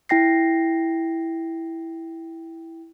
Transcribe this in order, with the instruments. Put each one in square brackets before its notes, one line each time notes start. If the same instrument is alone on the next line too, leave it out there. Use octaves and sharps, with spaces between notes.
[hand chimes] E4 G5 A#6 C7